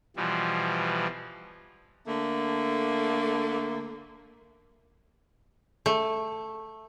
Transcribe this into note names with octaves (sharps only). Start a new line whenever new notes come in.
B2 E3 F3 G3
D3 A3 A#3
A3